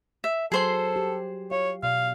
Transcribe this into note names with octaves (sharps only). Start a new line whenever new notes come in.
E5
F#3 G#4 A4 C5 C6
G4
C#5 F5
B2 D5 F5